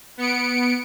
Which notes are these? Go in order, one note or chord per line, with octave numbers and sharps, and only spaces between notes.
B3 C#7 D7